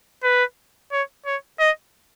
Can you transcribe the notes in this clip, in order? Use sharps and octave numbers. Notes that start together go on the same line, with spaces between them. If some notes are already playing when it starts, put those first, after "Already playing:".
B4
C#5
C#5
D#5